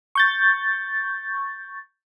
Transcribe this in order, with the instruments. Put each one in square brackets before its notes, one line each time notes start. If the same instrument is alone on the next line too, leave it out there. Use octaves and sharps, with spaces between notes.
[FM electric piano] C#6 G6 A6